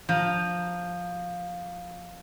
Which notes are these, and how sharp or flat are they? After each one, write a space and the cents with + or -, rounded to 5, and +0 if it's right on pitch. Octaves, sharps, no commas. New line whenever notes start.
F3 +10 A#5 +5